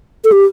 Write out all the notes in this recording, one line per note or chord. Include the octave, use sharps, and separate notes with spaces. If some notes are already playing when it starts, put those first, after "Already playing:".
A4
G4